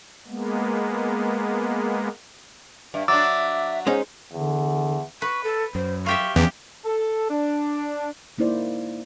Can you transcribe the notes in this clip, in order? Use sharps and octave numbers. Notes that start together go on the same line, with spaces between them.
G#3 A#3 B3
G2 E5
F#3 D4 E5 D6 E6 A6
G#3 C#4 D#4 C5
E2 D3
B4 C#6
A4
F#2 C5
F4 G4 E5 C#6
E2 F3 B3 C#4 G4
A4
D4
G#3 A#3 D#4 E4 C5 D5